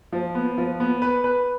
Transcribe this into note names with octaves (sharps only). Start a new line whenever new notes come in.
F3
B3
F3
B3
B4
B4